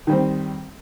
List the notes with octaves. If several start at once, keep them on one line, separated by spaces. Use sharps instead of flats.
D#3 G3 C4